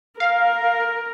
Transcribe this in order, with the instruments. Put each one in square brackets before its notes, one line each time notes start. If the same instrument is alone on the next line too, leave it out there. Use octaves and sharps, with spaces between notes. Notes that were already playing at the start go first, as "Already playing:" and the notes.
[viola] A#4 [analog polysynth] F5